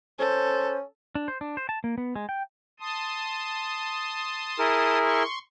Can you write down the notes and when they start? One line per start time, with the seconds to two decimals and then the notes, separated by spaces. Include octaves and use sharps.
0.19 C#4 A4 C5
1.15 D4
1.28 C5
1.41 D4
1.57 C5
1.69 A5
1.84 A#3
1.98 B3
2.16 G#3
2.29 G5
2.80 A5 C6 D#6
4.59 E4 G#4 A#4
5.02 C6 C#6